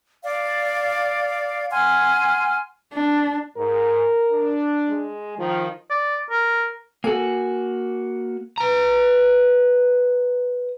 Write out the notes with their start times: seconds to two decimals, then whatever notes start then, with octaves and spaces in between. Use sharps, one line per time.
0.23 D5 F5
1.70 F#5 G#5 C6 F6
2.93 D4
3.57 G#2 A#4
4.32 D4
4.89 G#3
5.39 D#3 F3
5.90 D5
6.30 A#4
7.04 A#3 F#4 A4 G#5
8.58 B4 A#5